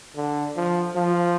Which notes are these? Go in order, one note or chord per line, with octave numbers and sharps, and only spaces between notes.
D3
F3
F3